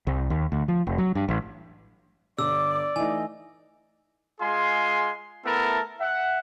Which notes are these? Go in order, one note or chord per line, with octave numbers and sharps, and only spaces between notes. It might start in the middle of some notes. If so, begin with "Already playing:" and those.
C2
D#2
D2
F3
F1
F#3
G2
A1
G1 D5 D6 E6
E3 A3 D#4 D#5 G#5
G#3 F4 G#4 G#5 C6
A3 B3 E4 A4 A#4 A5
E5 F#5